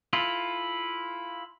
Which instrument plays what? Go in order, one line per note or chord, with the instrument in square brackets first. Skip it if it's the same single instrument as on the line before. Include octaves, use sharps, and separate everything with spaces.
[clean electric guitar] E4 F4 A4